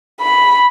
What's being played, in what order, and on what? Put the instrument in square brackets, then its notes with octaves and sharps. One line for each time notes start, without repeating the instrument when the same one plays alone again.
[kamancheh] B5